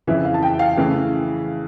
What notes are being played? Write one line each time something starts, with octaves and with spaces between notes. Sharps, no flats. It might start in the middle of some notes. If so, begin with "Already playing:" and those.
F2 C#3 E3 E5
F5
A5
G5
F5
C#3 E3 A3